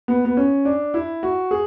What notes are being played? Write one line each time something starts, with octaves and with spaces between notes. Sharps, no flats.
B3
B3
C#4
D4
E4
F#4
G#4